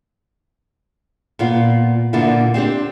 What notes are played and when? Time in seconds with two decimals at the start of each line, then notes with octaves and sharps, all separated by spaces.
1.39 A#2 B3 F4
2.13 A#2 D3 A#3 B3 E4 F4
2.54 C4 D4 G4 C5